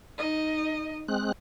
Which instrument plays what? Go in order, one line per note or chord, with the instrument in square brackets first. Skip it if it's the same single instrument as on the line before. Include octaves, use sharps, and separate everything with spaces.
[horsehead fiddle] D#4 D#5
[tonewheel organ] G#3 C4 F#6